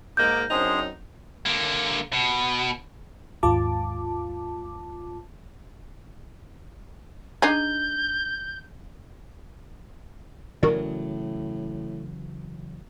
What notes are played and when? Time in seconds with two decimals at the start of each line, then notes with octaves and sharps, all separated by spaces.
0.17 G#2 G#3 A#3 D#4 D6 G6
0.50 F#2 C4 D4 D#4 G#4 C5
1.46 D3 A#3
2.13 B2
3.43 D#2 G#2 F4 A5 D6
7.42 D4 D#4 G#4 G6
10.63 A2 C#3 E3 F#3 F#4 A#4 D5